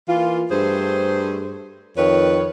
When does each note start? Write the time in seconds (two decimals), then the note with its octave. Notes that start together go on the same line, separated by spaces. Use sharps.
0.09 E3 A#3 F4
0.51 G2 A3 G#4 C5
1.97 F2 D#3 B4 C#5